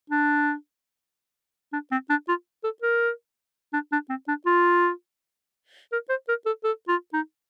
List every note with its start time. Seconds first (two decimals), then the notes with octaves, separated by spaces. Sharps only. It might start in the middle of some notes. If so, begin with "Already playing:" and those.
0.10 D4
1.73 D4
1.92 C4
2.10 D4
2.28 F4
2.64 A4
2.82 A#4
3.73 D4
3.92 D4
4.09 C4
4.28 D4
4.46 F4
5.92 A#4
6.09 C5
6.28 A#4
6.46 A4
6.64 A4
6.88 F4
7.13 D#4